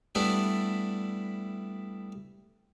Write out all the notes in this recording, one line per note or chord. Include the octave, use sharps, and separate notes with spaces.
G3 A3 B3 D4 E4